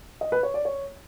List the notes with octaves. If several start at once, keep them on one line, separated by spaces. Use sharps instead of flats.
D#5
B4
C#5
D5
C#5